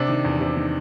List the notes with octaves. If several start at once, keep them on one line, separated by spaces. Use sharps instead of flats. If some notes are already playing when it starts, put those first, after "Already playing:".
Already playing: C3 D4
D#3
E2
C3
D#3